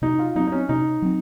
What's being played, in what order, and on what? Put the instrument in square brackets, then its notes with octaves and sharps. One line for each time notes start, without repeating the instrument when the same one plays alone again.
[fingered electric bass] C3 [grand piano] D#4
[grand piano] F4
[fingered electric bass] F#3 [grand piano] D#4
[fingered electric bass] C4
[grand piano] D#4
C#4
[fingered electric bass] C3 [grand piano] D#4
[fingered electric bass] F#3 C4